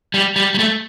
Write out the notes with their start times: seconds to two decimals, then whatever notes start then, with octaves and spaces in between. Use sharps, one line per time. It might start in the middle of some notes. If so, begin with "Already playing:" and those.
0.14 G3
0.36 G3
0.54 G3
0.59 A3